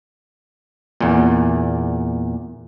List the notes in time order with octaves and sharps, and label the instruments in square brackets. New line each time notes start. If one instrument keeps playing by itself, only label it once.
[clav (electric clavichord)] E2 A#2